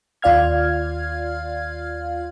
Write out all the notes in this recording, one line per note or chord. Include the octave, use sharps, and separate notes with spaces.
D#2 F4 D5 F5 F6 G#6